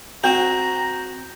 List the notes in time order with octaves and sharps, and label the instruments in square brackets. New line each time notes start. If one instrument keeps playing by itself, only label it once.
[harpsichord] C4 F#4 [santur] G5 [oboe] A#5